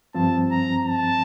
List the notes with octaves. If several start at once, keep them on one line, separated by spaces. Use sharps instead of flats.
G2 F3 C4 A5
A#5
A5